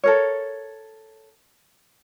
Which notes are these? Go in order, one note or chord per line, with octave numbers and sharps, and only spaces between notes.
A4 A#4 C#5